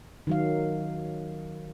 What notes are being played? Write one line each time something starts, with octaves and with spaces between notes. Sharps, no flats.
D#3 F#3 F5